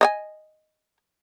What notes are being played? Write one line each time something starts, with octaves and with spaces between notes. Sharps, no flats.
D#5 E5 G#5